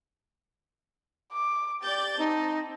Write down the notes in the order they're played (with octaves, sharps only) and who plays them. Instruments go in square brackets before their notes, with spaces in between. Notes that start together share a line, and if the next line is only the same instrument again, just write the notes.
[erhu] D6
[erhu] G4 [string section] D5 G6 A6
[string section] C4 [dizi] D#4 [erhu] A5